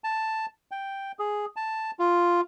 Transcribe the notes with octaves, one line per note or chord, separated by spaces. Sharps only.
A5
G5
G#4
A5
F4